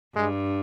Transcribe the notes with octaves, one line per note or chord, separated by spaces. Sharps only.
G2 G#3